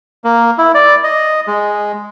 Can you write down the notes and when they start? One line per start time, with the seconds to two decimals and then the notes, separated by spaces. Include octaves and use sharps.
0.24 A#3
0.58 E4
0.75 D5
1.04 D#5
1.47 G#3